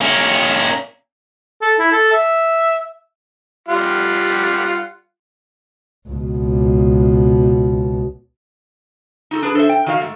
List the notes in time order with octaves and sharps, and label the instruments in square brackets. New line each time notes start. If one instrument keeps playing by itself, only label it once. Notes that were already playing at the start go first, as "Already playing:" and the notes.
[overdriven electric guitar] A#3 C#4
[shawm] A4
E4
A4
E5
[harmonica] G3 F4 F#5
[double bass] C#2 B2
[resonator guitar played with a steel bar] D#4 F#4 A4
D4 G#4 B4
A4 C5 C#5 E5
G5
D#3 F#3 F#4 D5 F5
G#2 A3